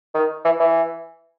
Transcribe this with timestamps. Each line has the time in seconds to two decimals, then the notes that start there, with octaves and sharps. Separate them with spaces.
0.14 D#3
0.45 E3
0.60 E3